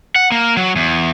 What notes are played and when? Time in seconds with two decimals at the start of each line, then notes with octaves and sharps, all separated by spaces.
0.16 F#5
0.32 A#3
0.57 F#3
0.76 E2